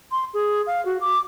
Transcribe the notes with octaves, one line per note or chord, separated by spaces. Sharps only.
C6
G#4
F5
F#4
D6